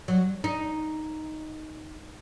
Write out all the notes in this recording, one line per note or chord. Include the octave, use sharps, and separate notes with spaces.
F#3
D#4